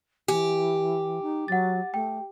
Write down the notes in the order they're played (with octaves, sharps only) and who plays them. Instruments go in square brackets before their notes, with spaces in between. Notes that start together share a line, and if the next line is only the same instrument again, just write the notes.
[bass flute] E3 [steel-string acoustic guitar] G4 [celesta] G#5
[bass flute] D#4
[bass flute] F#3 [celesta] F#5 A6
[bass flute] A3 [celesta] G5